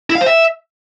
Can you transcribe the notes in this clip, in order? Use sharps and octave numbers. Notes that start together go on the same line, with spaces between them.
E4
F5
C5
E5